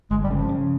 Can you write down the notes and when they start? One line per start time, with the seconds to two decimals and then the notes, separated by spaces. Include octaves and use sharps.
0.11 G1 G#3
0.24 G3
0.31 C#3
0.36 F3
0.49 C#3